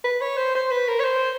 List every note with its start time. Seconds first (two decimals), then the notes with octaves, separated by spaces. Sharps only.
0.04 B4
0.21 C#5
0.37 C5
0.55 C5
0.71 B4
0.87 A#4
0.99 C#5
1.04 C5